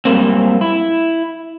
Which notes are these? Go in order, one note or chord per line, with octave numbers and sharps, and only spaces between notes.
F#2 A#2 G3 A3 A#3 C4
E4